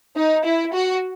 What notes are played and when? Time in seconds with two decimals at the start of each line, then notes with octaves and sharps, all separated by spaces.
0.16 D#4
0.45 E4
0.74 F#4